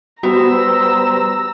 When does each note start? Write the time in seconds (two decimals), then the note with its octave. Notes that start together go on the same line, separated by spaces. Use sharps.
0.23 G3 B3 F#4 B4 C5 A#5 E6